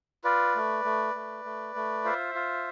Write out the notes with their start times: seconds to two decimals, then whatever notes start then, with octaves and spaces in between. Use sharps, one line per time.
0.24 F4 B4 D5
0.55 A3
0.85 A3
1.15 A3
1.45 A3
1.76 A3
2.05 F4 C5 E5
2.35 F4